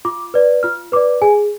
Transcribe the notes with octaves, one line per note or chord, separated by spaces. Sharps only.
F4 D6
B4 D5
F4 F6
B4 D5 D6
G#4 G#5